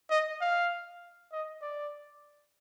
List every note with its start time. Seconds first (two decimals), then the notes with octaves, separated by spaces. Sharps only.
0.10 D#5
0.41 F5
1.32 D#5
1.62 D5